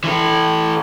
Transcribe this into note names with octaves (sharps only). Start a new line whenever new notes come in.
E3 A4